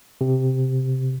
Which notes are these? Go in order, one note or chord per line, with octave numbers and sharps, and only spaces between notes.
C3